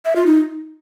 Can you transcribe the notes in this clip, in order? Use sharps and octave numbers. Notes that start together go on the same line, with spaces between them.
E5
F4
D#4